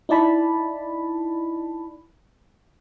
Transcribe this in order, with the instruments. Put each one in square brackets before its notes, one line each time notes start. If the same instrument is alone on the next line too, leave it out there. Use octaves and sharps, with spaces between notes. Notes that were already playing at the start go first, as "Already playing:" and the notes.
[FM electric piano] D#4 E4 D5 A5 B5